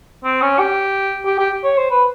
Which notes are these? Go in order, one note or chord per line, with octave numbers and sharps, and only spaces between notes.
C4
C#4
G4
G4
G4
C#5
C5
B4